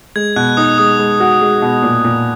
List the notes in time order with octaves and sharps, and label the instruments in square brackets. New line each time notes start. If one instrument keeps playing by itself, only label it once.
[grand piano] G#3 [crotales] G#6
[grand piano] B2 [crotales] F#6
[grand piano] D#4 [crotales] D#6
[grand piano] G#3 [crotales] D#6
[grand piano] G#3
F#4
G#3
B2
A#2
A#2